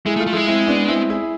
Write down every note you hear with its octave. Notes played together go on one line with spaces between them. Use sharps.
G#3 E4 G#4
A3
F4 A4
A3
F3 G#3 E4 G#4
C4 E4
B3 D4
C4 E4
E4 G#4